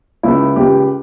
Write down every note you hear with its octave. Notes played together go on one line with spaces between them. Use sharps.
C#2 E4
C#2 G4